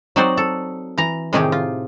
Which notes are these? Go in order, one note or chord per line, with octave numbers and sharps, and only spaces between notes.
F#3 C4 D#4 F#4 C5 D5
A4
E3 A#5
A2 C3 D#3 D#4 G4 G#4
F4